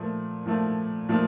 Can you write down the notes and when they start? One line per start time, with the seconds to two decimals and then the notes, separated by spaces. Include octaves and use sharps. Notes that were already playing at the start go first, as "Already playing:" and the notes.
Already playing: A#2 F3 A3
0.46 A#2 F3 A3
1.09 A#2 F3 A3